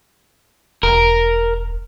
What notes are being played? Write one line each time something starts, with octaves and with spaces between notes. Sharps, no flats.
E1 A#4